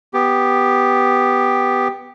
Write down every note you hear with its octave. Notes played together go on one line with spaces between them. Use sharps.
B3 G4